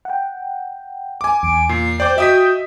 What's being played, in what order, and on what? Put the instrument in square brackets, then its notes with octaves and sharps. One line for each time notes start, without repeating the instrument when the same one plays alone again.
[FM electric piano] F#5 G5
[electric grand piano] G#5 D6
[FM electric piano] E2 [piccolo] D7
[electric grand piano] A#2 [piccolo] C7
[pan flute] C5 [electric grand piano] D5 D6 [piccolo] G5
[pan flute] F#4 [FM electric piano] D#5 [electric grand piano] E5 D#6 B6